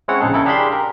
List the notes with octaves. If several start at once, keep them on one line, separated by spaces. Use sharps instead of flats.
G#3 C4 C#4 E4 C#5 F#5
A#1 C#3 D#4 G#4 A4
C#3 E4 A4 A#4
D4 G4 G#4 F5 B5 C6
A#4